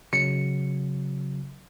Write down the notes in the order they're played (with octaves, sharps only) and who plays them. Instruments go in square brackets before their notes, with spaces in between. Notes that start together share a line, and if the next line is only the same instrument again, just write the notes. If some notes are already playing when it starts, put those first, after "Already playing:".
[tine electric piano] C#3 F#3 [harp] C#7